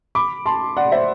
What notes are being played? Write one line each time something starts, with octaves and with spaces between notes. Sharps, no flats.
B5 D6
A5 C6
D5 F#5
C5 E5